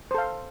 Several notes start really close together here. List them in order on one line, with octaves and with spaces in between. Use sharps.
C5 A4 F5